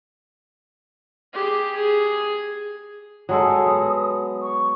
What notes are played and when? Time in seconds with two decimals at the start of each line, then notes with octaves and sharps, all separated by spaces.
1.33 G4 G#4
1.75 G#4
3.29 F#3 G#3 A4 D#6
3.66 B3
4.41 C#6